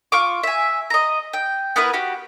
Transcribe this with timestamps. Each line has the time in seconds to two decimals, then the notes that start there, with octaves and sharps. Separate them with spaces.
0.12 F4 C#6 D6
0.43 E5 G#5
0.90 D#5 A#5
1.33 G5
1.76 B3 E4 A#4 B4
1.93 F#4 G4